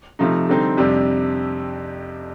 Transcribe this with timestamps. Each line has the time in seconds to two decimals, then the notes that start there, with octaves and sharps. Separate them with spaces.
0.19 C3 F3 A3 D#4
0.49 D3 G3 C4 D#4
0.77 F2 C3 G3 D4